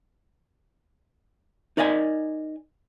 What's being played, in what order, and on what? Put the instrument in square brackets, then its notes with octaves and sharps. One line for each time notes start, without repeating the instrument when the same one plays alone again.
[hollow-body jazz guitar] D#4 A#4 D5 D#5 F#5 G#5